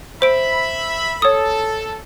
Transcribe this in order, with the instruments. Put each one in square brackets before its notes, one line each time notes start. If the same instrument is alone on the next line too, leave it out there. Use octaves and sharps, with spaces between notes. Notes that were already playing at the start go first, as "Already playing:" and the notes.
[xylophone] C5 D7 [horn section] E5 B5
[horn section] A4 [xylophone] C#5 D#6